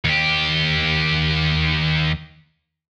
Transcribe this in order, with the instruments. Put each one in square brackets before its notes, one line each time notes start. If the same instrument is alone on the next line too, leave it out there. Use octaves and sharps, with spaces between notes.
[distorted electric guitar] D#2 G4